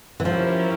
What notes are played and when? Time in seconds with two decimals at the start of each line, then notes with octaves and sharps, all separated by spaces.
0.20 E3
0.25 F3 C#4 E4 G4 A#4